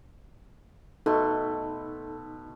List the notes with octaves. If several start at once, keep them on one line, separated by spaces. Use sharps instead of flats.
B2 A3 D#4 A4 B4 C6